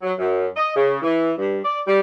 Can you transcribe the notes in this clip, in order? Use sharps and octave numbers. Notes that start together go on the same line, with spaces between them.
F#3
F#2
D#5
C#3
E3
G2
D5
G3